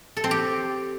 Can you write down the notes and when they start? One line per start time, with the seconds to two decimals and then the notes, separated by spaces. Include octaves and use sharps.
0.17 A4
0.24 C4
0.31 G4